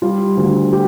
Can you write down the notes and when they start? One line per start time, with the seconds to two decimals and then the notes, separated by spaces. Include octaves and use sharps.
0.02 G3 F4
0.37 D2
0.72 G4